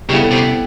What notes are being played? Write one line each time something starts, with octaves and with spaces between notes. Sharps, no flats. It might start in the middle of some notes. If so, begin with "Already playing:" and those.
C#3 G3 B3 E4 A4
C3